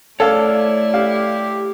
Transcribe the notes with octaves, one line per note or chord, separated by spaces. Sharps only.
A3 E4 A4 C#5 D5 F5
G4 F5